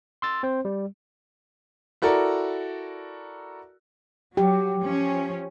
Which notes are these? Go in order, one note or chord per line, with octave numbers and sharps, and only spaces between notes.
C6 E6 A6
C4 C5
G3
E4 F#4 A4 A#4 D5
F#3 G4
F3 C#4